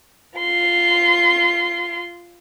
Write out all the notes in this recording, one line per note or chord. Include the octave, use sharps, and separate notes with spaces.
F4 C6